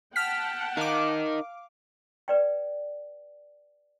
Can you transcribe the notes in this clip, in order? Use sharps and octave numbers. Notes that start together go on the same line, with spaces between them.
F#5 G5 A5 F6 B6
D#4 A#4 F5 D6
B4 D5 G5